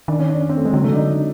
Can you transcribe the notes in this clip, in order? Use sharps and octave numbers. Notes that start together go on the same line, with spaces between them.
D#3 D4
C#4
D4
C#4
C4
A3
G#3
D3 F#3
C#3 A3
D3 D4 D#4